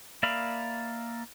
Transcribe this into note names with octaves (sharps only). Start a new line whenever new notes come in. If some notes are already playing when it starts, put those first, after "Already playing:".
A#3 D5 E5 F5 B5